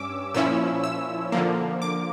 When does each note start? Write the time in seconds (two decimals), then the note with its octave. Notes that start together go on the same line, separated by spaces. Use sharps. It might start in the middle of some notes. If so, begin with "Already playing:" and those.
Already playing: G2 C#4 D6 E6
0.34 A#2 F3 C#4 E4 E6
0.84 E6
1.32 D3 F3 A#3
1.82 D6